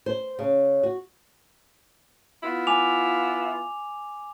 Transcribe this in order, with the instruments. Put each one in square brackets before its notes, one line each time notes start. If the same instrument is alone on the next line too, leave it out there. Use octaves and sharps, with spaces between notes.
[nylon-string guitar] C5
C#3
F#4
[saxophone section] B3 E4 F4
[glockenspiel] G#5 D6 F7